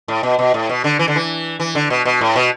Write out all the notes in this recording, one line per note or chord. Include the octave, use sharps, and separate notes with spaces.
A2
B2
B2
A2
B2
D3
E3
D3
E3
E3
D3
B2
B2
A2
B2